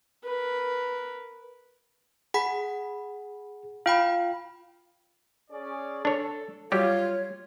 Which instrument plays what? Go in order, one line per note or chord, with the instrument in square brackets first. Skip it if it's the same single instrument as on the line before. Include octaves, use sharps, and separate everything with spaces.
[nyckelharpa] A#4 B4
[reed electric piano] G#4 [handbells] F#5 B5 B6
[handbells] F4 G5 B5 [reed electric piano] F5
[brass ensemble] C#4 G#4 D5
[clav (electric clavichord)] D4 C#5 [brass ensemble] A4
[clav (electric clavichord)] F#3 G3 G4 [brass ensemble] F4 [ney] C#5